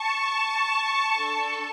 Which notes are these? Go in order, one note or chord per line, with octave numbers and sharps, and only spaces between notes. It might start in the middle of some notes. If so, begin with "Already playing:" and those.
Already playing: A5 C#6
D4 A4